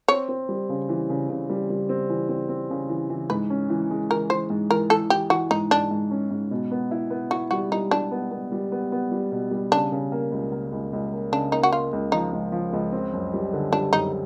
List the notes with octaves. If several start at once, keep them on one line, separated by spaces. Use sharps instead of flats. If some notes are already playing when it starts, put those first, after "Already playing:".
C4 C#5
C4
G3
C#3
E3
C#3
C#3
G3
G3
C4
E3
C4
C4
C#3
E3
E3
G#2 B4
C#4
E3
G#3
E3 A#4
E3 C5
G#2
E3 A#4
E3 A4
E3 G4
E3 F#4
G#2 D#4
G#2 D4
G#2
C#4
G#2
B2
B3
E4
B3
E4 F#4
G3 F#4
G3 D#4
G3 D4
B3
B3
G3
B3
B3
G3
B2
G3
C#3 D4
C#3
A#3
C#2
A#3
C#2
C#2
A#3
C#3 D4
A#3 D#4
F#4
A#3 F4
C#2
F3 D#4
C#2
F3
C#2
C4
F#2
G3
D3
G3 D4
F#2 D#4